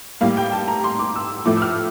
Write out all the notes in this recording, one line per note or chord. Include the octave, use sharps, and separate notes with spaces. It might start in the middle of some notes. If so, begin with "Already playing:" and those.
A2 G3 A#3 F5
G5
A5
A#5
C6
D6
E6
A2 F3 A3 D6
E6
F6